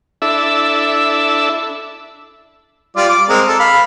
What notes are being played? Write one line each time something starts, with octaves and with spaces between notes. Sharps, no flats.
D4 E4 A4 E5
G3 F4 D5
D6
G#3 C4 A#4
A4
F5 B5